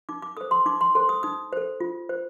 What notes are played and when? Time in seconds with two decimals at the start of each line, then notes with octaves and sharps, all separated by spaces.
0.09 D#4 D6
0.22 D6
0.37 A4 C5 D#6
0.51 C6
0.66 D#4 D6
0.81 C6
0.95 A4 C5 C6
1.09 D#6
1.23 D#4 D#6
1.53 A4 C5
1.80 F4
2.09 C5